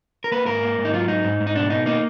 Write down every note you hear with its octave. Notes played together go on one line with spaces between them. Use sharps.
A#4
A#3 B4
G#2 A#4
A#3
G#2
D#4
F#3 F4
G#2 D#4
G#2
G#2
D#4
B2 D4
B2 D#4
A#3 D#4